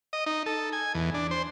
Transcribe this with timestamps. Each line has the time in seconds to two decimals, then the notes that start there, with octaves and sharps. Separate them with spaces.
0.13 D#5
0.26 D#4
0.46 A4
0.73 G#5
0.95 E2
1.14 D4
1.31 C5